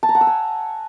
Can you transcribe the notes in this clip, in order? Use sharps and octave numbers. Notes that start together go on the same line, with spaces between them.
A5
A#5
F#5
E6
G#5